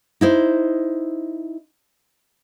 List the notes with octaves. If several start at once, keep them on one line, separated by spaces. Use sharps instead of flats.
D#4 E4 C5